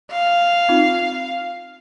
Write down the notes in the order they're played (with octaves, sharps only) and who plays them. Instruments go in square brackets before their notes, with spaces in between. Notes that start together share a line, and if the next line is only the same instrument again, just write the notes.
[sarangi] F5
[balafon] C4 D#4 F4